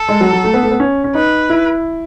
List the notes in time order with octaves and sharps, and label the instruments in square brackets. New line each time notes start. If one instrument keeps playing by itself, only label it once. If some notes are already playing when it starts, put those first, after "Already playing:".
Already playing: [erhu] A4
[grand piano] G#3
F#3
F#3
A3
B3
A3
B3
C#4
C#4
[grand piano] D#4 [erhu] B4
[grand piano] E4